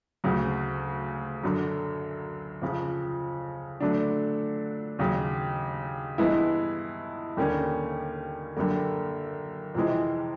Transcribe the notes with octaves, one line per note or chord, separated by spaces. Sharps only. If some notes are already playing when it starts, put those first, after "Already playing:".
D2 C#3 F#3
F#2 D3 F#3
F2 C#3 F3
D3 F#3 A3 D4
D#2 C#3 F#3
G2 E3 G#3 B3 E4
D#2 D3 G3 A#3 C#4
F#2 D3 G3 A#3
F2 C3 E3 G#3